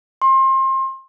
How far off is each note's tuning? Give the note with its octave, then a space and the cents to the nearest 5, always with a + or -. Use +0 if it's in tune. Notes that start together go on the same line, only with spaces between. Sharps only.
C6 +30